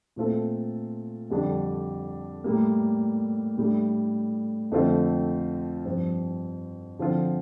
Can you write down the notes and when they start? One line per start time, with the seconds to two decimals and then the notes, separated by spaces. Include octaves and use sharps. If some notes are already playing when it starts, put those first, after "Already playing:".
0.16 A#2 A3 C4 F4 A4
1.30 F2 D3 G3 D4
2.44 A2 G3 A#3
3.58 A2 G3 D4
4.72 F2 D3 A3 C4 F4
5.85 G2 F3 C4
6.99 D3 F3 C4 F4